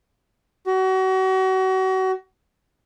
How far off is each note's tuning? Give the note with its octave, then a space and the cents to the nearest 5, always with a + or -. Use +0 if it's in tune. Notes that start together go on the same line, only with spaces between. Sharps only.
F#4 +35